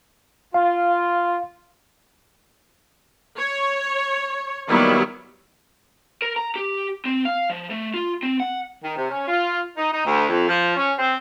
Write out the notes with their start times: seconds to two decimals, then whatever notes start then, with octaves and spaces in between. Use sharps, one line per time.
0.54 F4 F5
3.37 C#5
4.68 D#3 F#3 G3 A#3 B3 E4
6.22 A#4
6.36 A#5
6.56 G4
7.05 C4
7.25 F5
7.50 F3
7.70 A3
7.94 F4
8.23 C4
8.40 F#5
8.83 D#3
8.97 C3
9.11 C#4
9.28 F4
9.77 D#4
9.92 D#4
10.06 D2
10.30 F2
10.48 F3
10.77 C#4
10.98 C4